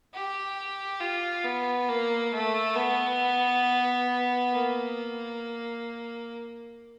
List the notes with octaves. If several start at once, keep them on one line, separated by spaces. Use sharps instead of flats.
G4
F4
B3
A#3
A3
B3
A#3